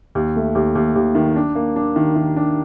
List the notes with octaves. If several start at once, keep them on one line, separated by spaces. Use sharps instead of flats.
D#2
A3
D#2
D#2
D#2
D#3
D4
A#3
D4
D#3
D#3
D4